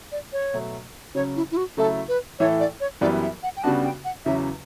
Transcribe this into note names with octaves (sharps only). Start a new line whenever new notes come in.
D5
C#5
B2 F#3 A3
C#3 F#3 C#4 C#5
E4
E4
F#4
C#3 F#3 A3 E4 A4
B4
A2 E3 A3 E4 A4 C#5
D5
C#5
F#2 E3 G3 B3 D5
E5
F#5
G5
C#3 G3 B3 D4 F#4 A5
G5
F#5
E2 C#3 F#3 C#4 E5